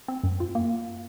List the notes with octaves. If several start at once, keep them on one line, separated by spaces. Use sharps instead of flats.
C4
F#2
F4
A#3